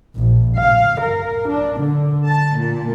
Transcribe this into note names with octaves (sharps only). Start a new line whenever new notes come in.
A#1
F5
A#4
D4
D3
A5
A#2